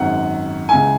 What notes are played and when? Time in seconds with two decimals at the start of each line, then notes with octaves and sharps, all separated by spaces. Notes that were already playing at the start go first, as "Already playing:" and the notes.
Already playing: G#1 F#2 D#3 F#5
0.69 C#2 C#3 E3 G#5